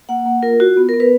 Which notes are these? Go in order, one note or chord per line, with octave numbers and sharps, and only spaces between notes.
A#3 F#5
A#3
F4 A#4
F4 F#4
B3
A#4
B3
B4